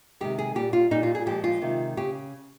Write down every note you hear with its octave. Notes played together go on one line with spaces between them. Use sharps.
C3 D#3 G#3 G4
G#4
A#2 G3 G4
F4
A#2 G3 D#4
F4
G#4
A#2 F3 G#3 G4
F4
C3 D#3 G#3
C#3 G4